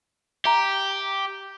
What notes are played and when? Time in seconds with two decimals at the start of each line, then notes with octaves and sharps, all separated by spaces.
0.45 G4 E5 A#5